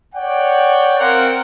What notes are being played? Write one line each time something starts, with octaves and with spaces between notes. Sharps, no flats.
C#5 D5 F#5 G5
C4 A#4 F5 F#5